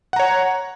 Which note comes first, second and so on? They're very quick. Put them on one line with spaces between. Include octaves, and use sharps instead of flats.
F#5 A#5 C#5